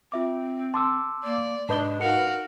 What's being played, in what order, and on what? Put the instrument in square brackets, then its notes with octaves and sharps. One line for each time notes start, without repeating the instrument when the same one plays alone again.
[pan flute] C4 [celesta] F4 E5 D6
[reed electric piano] A5 D6 E6 [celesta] C6
[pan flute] A#3 [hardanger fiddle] D5
[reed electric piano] G#2 B4 D#5 [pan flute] D4 [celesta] A5 G6 G7
[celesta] D#4 C#7 [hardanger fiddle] F#4 F5 [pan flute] A#4